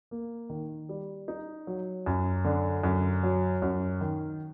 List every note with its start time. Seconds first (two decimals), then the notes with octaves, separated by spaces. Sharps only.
0.11 A#3
0.50 D#3
0.89 G3
1.28 D#4
1.67 F#3
2.06 F#2
2.45 D3
2.84 F#2
3.23 F#3
3.62 F#2
4.01 D#3